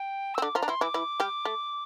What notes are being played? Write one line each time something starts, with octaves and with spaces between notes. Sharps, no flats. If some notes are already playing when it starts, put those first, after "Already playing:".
Already playing: G5
C4 E6
D3 D4 D6
F3 F4 A#5
D4
E3 E4 C6
E3 E4 D6
E3 E4
G3 G4
A3